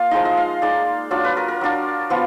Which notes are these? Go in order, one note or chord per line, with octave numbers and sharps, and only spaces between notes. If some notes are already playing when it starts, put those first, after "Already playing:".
Already playing: A#3 F4 F5
F3 G#3 D#4 D#5
D#5
F5
G#3 D#4 D5
F#3 D4 F4
B4
A#4
A#4
F#3 D4 F4
F3 B3 F4